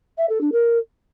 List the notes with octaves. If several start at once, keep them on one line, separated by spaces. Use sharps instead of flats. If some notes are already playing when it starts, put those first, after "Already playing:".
E5
A4
D4
A#4